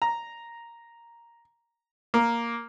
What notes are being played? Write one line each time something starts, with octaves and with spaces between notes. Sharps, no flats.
A#5
A#3